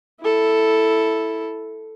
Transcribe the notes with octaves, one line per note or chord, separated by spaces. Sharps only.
E4 A4